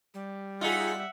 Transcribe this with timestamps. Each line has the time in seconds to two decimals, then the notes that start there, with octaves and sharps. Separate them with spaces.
0.14 G3
0.61 D#4 F4 G#4 E5 F#5 B6